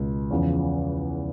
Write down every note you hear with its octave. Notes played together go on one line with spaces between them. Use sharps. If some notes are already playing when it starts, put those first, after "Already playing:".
Already playing: C#2 B2
E2 C#3 F3